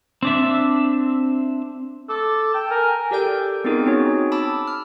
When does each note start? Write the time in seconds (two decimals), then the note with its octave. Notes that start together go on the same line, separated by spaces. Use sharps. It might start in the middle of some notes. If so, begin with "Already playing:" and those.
0.23 C4 D4 E5
2.09 A4 D6
2.54 G5 A5
2.70 A#4 G#5
3.11 G4 A4 A#4 D5 G5 G6
3.64 B3 C4 D#4 F4 G#4 A#4
3.86 C4 C#4 D#4 F#4 G#4 C#5
4.32 A5 B5 D6 E6
4.67 F6